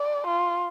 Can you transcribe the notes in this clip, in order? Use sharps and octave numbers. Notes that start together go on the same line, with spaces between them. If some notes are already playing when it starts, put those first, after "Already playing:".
Already playing: D5
F4